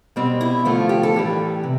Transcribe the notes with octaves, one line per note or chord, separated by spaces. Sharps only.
B2 G3 C4
E4
D3 F3 A3 F4
G4
A4
A2 E3 G3 G4
C3